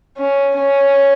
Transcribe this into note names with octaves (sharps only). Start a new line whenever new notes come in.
C#4
C#4